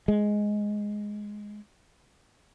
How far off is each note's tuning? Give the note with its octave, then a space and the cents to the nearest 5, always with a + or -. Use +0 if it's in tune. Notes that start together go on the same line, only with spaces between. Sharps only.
G#3 +5